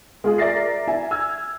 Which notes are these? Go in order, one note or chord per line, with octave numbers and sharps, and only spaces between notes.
G#3 F4 G#4
A#4 D5 E5 A6 A#6 C7
E4 E5 G#5
E6 F6 G#6